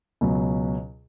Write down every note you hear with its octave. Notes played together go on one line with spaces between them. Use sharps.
C#2 B2 F#3